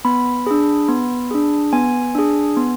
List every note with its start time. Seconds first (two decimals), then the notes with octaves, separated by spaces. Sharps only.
0.05 B3 B5
0.47 D4 G#4
0.88 B3
1.31 D4 G#4
1.73 B3 G#5
2.15 D4 G#4
2.57 B3